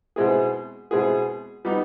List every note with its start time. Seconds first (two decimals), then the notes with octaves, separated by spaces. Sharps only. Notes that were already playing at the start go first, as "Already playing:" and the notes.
0.16 B2 G#3 C4 E4 G#4
0.91 B2 G#3 C4 E4 G#4
1.65 G3 B3 D#4